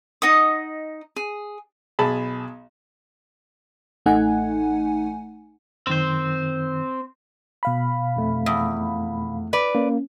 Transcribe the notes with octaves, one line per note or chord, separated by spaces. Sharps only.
D#4 D#5 F#5 D#6
G#4
B1 G#4 A5 B5
A1 A3 D#4 F#5 G#5
F#2 D#3 C4 C5
B2 F5 B5
F2 A3
E2
B4 D5
A#3 C#4